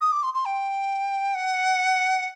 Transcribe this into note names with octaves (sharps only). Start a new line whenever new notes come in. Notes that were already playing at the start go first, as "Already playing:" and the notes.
D#6
D6
C6
C6
G5
F#5